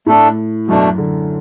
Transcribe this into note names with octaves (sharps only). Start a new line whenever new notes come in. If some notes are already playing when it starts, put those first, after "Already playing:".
A2 A3 D4 A4
F#2 B2 A3 D4
D3